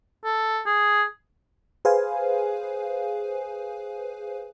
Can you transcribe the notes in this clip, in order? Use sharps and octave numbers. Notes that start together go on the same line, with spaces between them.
A4
G#4
G#4 B4 C5 F5 G#5